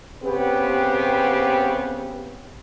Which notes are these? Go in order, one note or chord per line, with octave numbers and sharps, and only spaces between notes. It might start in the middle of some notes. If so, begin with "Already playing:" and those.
C#3 B3 C4 G4 B4